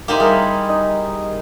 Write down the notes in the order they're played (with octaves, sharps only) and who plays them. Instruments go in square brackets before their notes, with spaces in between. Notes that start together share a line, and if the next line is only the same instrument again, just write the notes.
[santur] A#3 C5 [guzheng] D#4 E4 G4
[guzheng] G3 [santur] G#4 A#4 B5
[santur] D#4